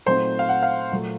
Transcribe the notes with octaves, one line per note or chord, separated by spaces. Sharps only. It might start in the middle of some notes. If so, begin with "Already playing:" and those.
A#2 F#3 A3 C4 D#4 C5
F5
F#5
F5
A#2 F#3 A3